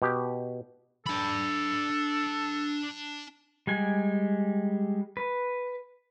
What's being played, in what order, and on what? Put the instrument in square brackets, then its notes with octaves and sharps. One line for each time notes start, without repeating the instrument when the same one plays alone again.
[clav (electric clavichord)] B2 G4
[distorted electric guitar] D4 B5 [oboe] A4
[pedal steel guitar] G3 G#3 G#5
B4